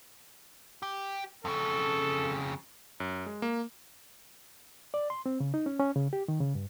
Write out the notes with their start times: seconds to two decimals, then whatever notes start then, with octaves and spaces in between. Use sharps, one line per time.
0.83 G4
1.45 F2 C#3 A4
3.00 F#2
3.26 G#3
3.42 A#3
4.94 D5
5.10 C6
5.26 C4
5.40 C#3
5.54 D#4
5.66 C#4
5.80 C#4
5.96 C#3
6.13 G4
6.28 D#3
6.40 C#3
6.55 G2